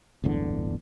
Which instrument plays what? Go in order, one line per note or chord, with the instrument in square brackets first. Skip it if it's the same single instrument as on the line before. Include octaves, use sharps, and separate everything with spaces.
[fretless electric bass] D1 G1 E2 D3